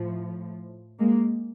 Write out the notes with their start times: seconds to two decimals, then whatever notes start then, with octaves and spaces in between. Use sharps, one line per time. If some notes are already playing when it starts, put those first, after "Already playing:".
Already playing: A2 F3
0.99 G#3 A#3